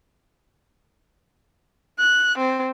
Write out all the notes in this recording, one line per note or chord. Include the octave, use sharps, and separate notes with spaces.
F#6
C4